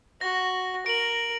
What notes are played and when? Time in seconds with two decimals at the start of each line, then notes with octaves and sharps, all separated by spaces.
0.21 F#4 A#6
0.86 A#4 D7 F#7